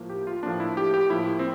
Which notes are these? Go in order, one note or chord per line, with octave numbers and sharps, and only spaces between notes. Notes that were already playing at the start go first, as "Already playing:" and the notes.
Already playing: A2 F3 A#3
G4
F4
A2 F3 A#3 D4
E4
G4
G4
A2 F3 A#3 E4
C4